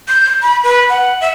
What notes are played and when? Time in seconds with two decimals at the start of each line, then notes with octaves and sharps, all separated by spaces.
0.08 G6
0.42 B5
0.64 B4
0.89 F#5
1.21 E5